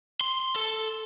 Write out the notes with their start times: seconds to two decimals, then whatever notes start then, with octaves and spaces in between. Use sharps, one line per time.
0.21 C6
0.56 A4